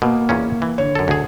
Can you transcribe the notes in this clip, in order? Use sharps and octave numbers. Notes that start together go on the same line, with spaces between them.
B2 A#3
E2 A#2 C#4
E3
D3 C#5
F#2 A4
D2 G#4